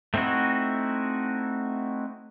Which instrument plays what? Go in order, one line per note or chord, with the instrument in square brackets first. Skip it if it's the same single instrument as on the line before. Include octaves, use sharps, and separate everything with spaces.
[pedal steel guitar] A3 C4 D#4 E4 F#4